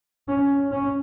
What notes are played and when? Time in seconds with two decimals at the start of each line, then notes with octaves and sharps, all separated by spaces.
0.28 C#4
0.72 C#4